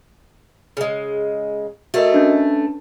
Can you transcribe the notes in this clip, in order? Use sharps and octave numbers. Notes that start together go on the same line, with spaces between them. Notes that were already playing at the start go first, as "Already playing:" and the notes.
C#3 G#3
A3 F#4 A#4 D#5
C#4 D4 B4